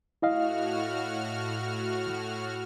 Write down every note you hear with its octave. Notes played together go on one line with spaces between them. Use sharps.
A2 E4 F#4 D#5 F5 F6